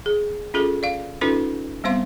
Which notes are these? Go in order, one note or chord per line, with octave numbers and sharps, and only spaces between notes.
G#4
C#4 F4 G#4 A4
D5 F5
C#4 D#4 F4 A4 B4
G3 B3 C4 C5 F5 C6